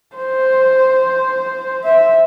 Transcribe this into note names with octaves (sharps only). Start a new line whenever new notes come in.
C5
E5